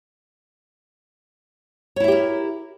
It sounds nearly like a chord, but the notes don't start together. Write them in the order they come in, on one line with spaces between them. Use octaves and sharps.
C#5 E4 E5 G4 A#4